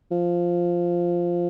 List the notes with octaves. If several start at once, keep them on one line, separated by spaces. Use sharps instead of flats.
F3